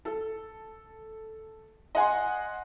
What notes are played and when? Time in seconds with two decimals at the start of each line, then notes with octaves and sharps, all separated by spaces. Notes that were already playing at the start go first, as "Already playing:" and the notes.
0.05 A4
1.95 D#5 F#5 G#5 C6